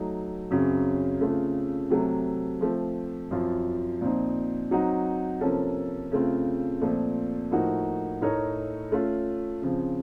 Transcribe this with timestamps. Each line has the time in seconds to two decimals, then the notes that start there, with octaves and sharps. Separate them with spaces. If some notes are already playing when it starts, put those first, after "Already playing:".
Already playing: F#3 A3 D#4
0.51 F#2 C#3 F#3 C4
1.21 C#3 A3 C4 F4 A4
1.90 C3 F#3 A3
2.61 F3 A3 C4
3.31 F#2 F3 C4 F4
4.01 A#2 F3 C4 D#4
4.71 F#3 C4 D#4 F#4
5.41 C3 F3 A#3 C#4 A4
6.12 C#3 A3 C4 F4
6.81 A#2 F3 A3 C4
7.51 A2 F3 A#3 D#4 F#4
8.22 A2 A3 D#4 A#4 C#5
8.92 A3 C#4 F4
9.62 C#3 F3 C4